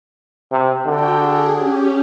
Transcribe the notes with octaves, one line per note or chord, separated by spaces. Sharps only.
C3
D3 F#4 G5
G#4
C#4 G4